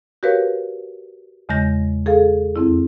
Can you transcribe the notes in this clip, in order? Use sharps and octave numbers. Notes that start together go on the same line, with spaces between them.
F#4 G4 A#4 B4 C#5 F5
E2 C#3 G#3 D#5 G6 A#6
G#4 A4 F5
F2 C4 E4